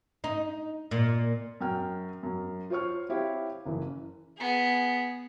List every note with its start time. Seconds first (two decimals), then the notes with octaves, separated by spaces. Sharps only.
0.24 D#4
0.91 A#2
1.61 F#2 G5 F6
2.23 F#2
2.70 F4 C5 C#5 C#6 F6
3.09 C4 E4 G4 C#5 E5 F5
3.66 F#1 E3
4.37 B3 G#4